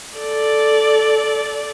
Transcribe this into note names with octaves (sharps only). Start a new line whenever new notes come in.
A4 D5